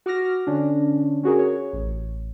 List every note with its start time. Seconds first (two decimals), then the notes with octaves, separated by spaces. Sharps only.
0.06 F#4 D6 F6 A#6
0.47 D3 C#4 D4
1.23 C#4 F#4 G#4 A#4
1.39 C#5
1.73 A1